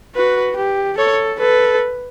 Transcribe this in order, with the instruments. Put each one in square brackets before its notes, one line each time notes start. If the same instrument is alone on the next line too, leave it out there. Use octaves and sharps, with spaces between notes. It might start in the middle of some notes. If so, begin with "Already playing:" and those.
[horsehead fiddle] F#4 [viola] B4
[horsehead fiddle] G4
[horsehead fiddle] A4 [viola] C#5
[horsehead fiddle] A4 [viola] B4